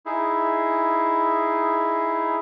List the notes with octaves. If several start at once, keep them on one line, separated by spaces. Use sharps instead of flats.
D#4 E4 G#4